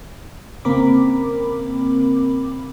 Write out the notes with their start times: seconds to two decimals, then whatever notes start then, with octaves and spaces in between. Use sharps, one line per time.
0.65 C#3 A#3 C4 A#4 B5 D6